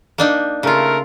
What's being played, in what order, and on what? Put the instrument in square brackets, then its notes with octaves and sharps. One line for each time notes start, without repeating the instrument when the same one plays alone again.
[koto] A#3 D4 D#4
[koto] C#3 F4 [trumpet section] A3 A#4